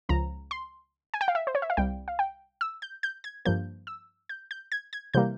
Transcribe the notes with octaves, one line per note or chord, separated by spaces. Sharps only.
C#2 C#3 F3 A#5
C6
G#5
G5
F5
E5
C5
C#5
E5
F5
C2 C3 G3 G5
F5
G5
E6
G6
G6
G#6
G2 F3 A#3 G6
E6
G6
G6
G#6
G#6
C3 E3 G3 A#3 G6